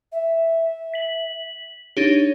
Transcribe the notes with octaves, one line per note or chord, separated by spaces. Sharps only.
E5
B6 F#7
D4 D#4 G4 C#5